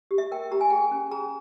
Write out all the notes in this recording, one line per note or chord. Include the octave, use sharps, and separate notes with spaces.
G4
E5
A#4 G5
G4 A#5
G#5
G#4 G5
G#5
C#4
G#4 A#5